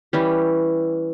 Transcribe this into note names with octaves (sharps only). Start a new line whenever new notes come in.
E3 G3 C#4 G4